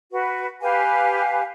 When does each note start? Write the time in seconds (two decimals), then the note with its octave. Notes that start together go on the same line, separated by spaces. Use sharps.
0.11 F#4 B4
0.61 G4 B4 F5 G#5